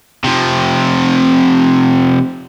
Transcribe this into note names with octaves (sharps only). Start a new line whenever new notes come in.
C3 F3